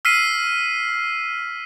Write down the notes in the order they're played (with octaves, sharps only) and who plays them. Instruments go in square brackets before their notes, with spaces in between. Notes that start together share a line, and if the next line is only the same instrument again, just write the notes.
[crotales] E6 F6 B6 C7 D#7